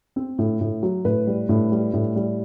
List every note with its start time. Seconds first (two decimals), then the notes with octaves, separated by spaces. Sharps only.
0.16 C4
0.39 A2
0.61 A2
0.83 F#3
1.05 A2 B4
1.27 G3
1.49 A2
1.72 G3
1.93 A2
2.16 G3